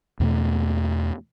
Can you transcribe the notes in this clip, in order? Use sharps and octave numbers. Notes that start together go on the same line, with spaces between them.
E2 B2 A3